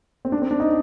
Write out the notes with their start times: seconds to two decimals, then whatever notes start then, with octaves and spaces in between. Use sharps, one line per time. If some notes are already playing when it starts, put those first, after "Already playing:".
0.25 C4
0.32 D4
0.42 C4
0.51 D4
0.60 D#4